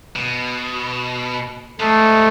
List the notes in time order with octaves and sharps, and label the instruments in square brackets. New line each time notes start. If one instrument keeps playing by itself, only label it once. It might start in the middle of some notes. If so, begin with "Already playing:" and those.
[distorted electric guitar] B2
[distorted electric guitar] C3 G#3 [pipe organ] A3